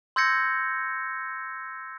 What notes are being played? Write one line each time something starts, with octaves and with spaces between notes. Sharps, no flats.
C6 E6 G6 G#6 A#6 C#7